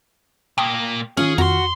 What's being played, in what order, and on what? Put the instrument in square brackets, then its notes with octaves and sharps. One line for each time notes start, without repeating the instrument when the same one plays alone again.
[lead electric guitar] A#2 A#3 [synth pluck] G5 A5 D#6
[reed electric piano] D#3 F4 F6 [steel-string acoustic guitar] C#4 [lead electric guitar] G#4
[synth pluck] F2 [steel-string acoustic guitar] F#4 [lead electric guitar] A#5 C6